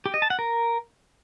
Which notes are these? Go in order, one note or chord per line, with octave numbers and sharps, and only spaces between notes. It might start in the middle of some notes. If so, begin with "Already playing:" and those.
G4
D#5
A5
F#5
A#4